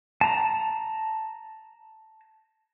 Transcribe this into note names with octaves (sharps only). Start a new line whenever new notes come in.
A5 A#5